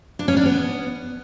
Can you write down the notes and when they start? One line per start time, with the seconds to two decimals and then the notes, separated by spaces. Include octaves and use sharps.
0.19 D4
0.28 C#4
0.37 D4
0.45 B3